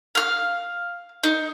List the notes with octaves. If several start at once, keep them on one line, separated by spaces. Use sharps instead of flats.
F5 F6
D#4